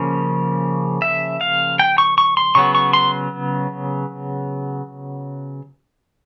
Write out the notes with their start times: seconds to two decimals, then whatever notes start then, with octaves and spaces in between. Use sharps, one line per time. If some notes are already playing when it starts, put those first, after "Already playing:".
Already playing: C#3 F3 A#3 C#4
1.02 E5
1.41 F5
1.79 G5
1.98 C#6
2.18 C#6
2.37 C6
2.55 C#3 F#3 B3 C#6
2.75 C#6
2.93 C6